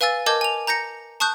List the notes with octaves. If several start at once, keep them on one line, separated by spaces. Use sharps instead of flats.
B4 F5 G#5 E6 A6
A#4 D#5 A5 D6 G6 G#6
G#5 F7
A#5 G6 A#6 C#7
A5 C#6 D#6 F#6 G6